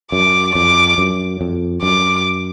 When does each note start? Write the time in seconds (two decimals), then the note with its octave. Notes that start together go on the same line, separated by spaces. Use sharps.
0.12 F#2 D6
0.55 F2 D6
0.98 F#2
1.41 F2
1.82 F#2 D6